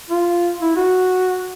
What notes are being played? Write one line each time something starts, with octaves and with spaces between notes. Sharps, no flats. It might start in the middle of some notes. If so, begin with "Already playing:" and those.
F4
E4
F#4